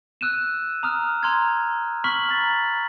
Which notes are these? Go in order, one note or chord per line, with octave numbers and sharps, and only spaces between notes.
E6 F#6 D#7 E7
A#5 D#6 F6
A#5 C6 F6 G#6
B5 C#6 F6 B6 F#7
A#5 A6